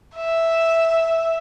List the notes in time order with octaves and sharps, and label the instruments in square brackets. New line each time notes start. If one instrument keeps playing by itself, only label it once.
[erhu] E5